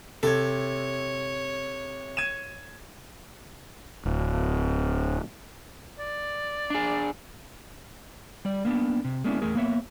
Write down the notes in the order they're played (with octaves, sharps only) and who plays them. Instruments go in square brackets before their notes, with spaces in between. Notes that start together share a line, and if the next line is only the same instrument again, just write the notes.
[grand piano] C3 G#6 [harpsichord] A4 [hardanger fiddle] C#5
[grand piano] G#6 D#7 E7
[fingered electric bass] D1
[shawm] D5
[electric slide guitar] D4 G#4
G3 D5
A#3 B3 D4
C3
G#3 A#3 B3 C#4 D4 E4
E2 A3 G#4 A#4
A#3 B3 C#5 E5